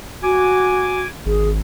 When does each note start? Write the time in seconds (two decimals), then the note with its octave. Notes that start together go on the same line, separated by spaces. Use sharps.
0.23 F#4 G#5 D6
1.26 G#1 G#4